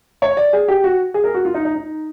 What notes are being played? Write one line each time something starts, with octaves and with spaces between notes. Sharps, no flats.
C#5
D5
G#4
G4
F#4
G#4
A#4
F#4
F4
D#4
D#4
D#4